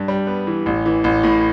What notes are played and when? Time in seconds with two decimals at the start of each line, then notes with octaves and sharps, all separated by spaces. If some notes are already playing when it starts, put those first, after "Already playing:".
Already playing: G2
0.08 G3
0.27 B3
0.47 E3
0.66 A1
0.86 E3
1.04 A1
1.23 A2